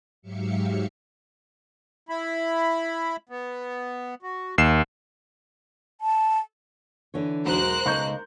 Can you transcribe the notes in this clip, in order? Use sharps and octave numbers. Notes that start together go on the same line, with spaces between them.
G#2 F#3 G4 E5 F5 C#7
E4 B5
B3
F#4
D#2 A#3 C7 E7
A5
D3 E3 C#5
E1 B1 A#4 C5 F#6
C#2 B2 A3 D#4 C#6 G6